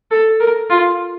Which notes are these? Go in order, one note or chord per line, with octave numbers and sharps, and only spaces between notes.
A4
A#4
F4